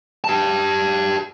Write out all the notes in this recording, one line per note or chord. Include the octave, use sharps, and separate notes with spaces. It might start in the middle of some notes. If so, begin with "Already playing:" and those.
G4 A5